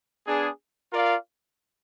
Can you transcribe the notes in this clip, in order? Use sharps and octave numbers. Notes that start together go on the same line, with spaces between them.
B3 D4 G#4
F4 A#4 D5 F5